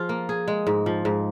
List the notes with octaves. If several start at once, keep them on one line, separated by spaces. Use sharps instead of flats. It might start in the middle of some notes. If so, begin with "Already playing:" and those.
Already playing: F3 F4 G#4
A#3
G#4
G#3
G#2
F3
G#2